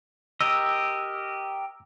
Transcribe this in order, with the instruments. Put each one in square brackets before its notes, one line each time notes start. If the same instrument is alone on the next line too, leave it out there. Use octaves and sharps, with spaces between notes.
[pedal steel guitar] G4 A#4 D#5 [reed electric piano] E6